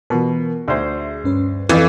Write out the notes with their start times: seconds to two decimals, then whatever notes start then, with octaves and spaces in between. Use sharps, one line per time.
0.10 B2 E3 F4 A#4
0.68 D2 G#4 C5 E5
1.24 G2 C#4 B4
1.69 F2 E3 B4 D#5 E5